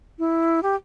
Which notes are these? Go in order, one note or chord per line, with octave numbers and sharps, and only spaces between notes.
E4
G4